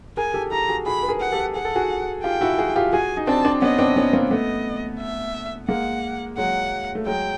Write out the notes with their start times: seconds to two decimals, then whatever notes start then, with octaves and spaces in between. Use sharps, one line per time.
0.17 G#4 A#4 G#5
0.34 G4 A4
0.51 G4 A4 A#5
0.69 F#4 G#4
0.86 F#4 G#4 B5
1.03 B4
1.08 G#4 A#4
1.21 F#5
1.32 G4 A4
1.55 G#4 F#5
1.65 A4
1.76 F#4 G#4
2.24 F4 G4 G5
2.41 E4 F#4
2.59 F#4 G#4
2.76 F4 G4
2.93 F#4 G#4 G#5
3.17 D#4
3.27 C4 D4 A5
3.45 C4 D4
3.62 B3 C#4 D#5
3.79 C4 D4
3.96 B3 C#4
4.13 A#3 C4
4.31 A3 B3 D#5
5.00 E5
5.68 G#3 A#3 F#5
6.37 F#3 G#3 F#5
6.95 A3
7.06 F#3 G#3 G5